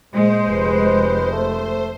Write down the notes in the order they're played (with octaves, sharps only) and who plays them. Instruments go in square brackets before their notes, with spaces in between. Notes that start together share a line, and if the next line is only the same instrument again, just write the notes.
[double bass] A#2 [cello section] G#3 [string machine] C5
[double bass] F1 [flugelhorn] B4
[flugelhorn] A3